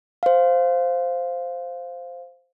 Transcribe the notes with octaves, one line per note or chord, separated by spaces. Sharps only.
C5 F5